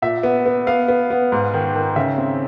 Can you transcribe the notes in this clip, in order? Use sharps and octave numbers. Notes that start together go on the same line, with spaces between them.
A#2 E5
B3
B3
B3 F5
B3
B3
G#2
D#3
D#3
C#3 E5
C4